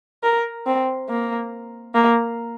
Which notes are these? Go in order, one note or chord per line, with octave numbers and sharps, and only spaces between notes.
A#4
C4
A#3
A#3